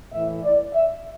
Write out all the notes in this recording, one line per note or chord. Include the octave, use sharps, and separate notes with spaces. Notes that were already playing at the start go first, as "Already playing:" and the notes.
A2 E3 E5
D5
E5